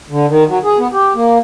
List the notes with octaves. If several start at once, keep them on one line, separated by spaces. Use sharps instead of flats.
D3
D#3
F#3
G#4
B3
G4
A#3